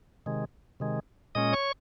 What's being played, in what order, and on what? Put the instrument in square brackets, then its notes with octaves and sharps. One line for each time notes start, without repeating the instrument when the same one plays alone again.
[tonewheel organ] C3 D#3 G#3
C3 D#3 G#3
A#2 G#3 C#4 D#5 D#6
C#5 C#6